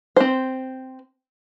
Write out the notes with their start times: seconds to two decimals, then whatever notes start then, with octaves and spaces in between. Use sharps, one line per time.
0.16 C4 C5